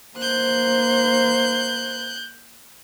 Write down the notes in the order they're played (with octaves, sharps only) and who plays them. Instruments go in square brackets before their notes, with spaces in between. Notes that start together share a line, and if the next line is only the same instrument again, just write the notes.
[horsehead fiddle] A#3 C5 [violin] F#6 G6